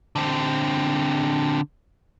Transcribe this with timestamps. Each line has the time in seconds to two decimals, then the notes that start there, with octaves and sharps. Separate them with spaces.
0.16 D3 C4